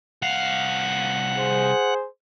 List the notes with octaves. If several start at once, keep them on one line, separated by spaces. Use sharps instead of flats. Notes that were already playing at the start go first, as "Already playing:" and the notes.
C2 F5 F#5
G#4 C5